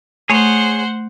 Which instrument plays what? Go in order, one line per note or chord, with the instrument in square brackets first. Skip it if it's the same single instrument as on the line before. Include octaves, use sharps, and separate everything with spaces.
[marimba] A3 [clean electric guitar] G#4 C#5 [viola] C5 F#5